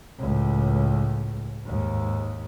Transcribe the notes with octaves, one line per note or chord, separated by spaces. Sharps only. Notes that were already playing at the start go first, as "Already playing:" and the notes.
C#2 A2
D#2 G#2